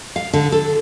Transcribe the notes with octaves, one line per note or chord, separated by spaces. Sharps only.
F5
D3
A4